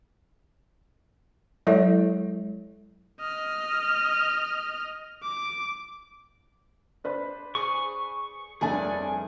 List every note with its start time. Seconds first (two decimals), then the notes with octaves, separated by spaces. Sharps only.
1.67 F#3 G#3 E4 A4 C#5 E5
3.20 D#5 F6
5.23 D6
7.04 D4 B4 C5
7.55 G#4 C#6
8.61 F1 G2 A3 D4 G#4 G#5